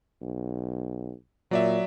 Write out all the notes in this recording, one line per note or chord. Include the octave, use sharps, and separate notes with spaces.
B1
A#2 F#3 D5 E5